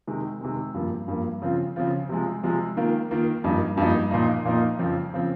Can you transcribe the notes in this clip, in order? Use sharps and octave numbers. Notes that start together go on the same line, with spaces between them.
C3 D#3 G#3
C3 D#3 G#3
G2 F3 A#3
G2 F3 A#3
C#3 F3 C4 F4
C#3 F3 C4 F4
C3 F3 G#3
C3 F3 G#3
D#3 A#3 F4
D#3 A#3 F4
G2 F3 A#3 D#4
G2 F3 A#3 D#4
A#2 F3 A#3 D#4
A#2 F3 A#3 D#4
F2 C#3 F3 C4
C#3 F3 C4